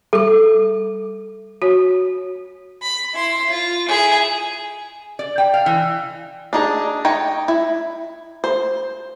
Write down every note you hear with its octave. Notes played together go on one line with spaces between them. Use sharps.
G3 A4 D6
F#4 C#5
B5
E4 C6
F4
E4 G#4
D5
G5
F5
E3
D4 D#4 G#4
D#4 C#5 G5
E4
C5